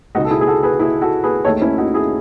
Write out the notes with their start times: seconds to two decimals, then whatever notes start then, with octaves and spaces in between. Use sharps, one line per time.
0.15 C#2 B2 G#3 D#4 F#4
0.24 A4
0.31 E4 G#4
0.41 G#4
0.47 F#4 A4
0.63 G#4 B4
0.80 E4 G#4
1.02 F#4 A4
1.24 G#4 B4
1.45 D#2 D#3 A3 A4 C#5
1.62 C#4 E4
1.78 D#4 F#4
1.94 E4 G#4